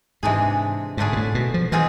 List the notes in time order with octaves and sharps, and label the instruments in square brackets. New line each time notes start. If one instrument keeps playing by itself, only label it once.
[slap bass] G#2 [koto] C3 E3 G#3 D4 G#4
[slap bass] G#2 [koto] D3 A3 D4 G#4
[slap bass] B2
A2
B2
F3
[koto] B2 G#3 C4 F4 G#4 [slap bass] E3